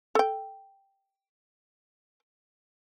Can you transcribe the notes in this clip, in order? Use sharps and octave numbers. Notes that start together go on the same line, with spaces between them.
A4 G5